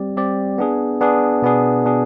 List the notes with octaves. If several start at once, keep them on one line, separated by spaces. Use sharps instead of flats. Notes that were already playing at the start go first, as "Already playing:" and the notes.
Already playing: G3 C4 G4 D5
G3 C4 G4 D5
B3 D4 G#4
B3 D4 G#4
B2 B3 D4 G#4
B2 B3 D4 G#4